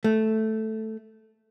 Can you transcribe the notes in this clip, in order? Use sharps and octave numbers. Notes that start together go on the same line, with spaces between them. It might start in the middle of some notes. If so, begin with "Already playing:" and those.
A3